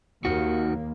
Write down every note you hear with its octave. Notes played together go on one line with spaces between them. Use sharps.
D#2 D#3 A#3 F#4